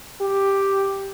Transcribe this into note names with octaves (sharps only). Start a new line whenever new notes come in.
G4